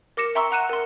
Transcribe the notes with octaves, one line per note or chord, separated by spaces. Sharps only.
A#4 D6 A#6 C#7 E7
E5 G5 A#5 C6 C#6 E6
F#5 A#5 F#6 C#7 D#7 E7
A#4 C6